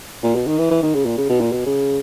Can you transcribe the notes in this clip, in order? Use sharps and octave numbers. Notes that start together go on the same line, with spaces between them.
A#2
B2
D#3
E3
E3
D#3
C#3
A#2
C#3
B2
A#2
B2
C#3